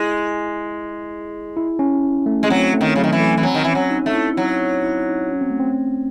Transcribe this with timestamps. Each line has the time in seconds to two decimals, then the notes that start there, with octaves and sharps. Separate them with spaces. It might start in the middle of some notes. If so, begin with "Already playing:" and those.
Already playing: G#3 E4
1.57 E4
1.79 C#4
2.26 A3
2.43 G#3
2.50 F#3 C4
2.74 A3
2.81 D#3
2.96 C#3 F#3
3.03 D#3
3.13 E3
3.20 A3
3.37 E3
3.43 F#3 C4
3.54 D#3
3.64 E3 C#4
3.75 F#3
3.91 D#4
4.06 A3
4.14 E4
4.37 F#3 E4
4.84 E4
5.08 D#4
5.31 C#4
5.41 C4
5.50 A3
5.59 C4